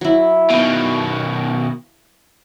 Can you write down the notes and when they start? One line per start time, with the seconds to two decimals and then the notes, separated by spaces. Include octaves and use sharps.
0.01 F#3 E4
0.50 B2 D#3 F5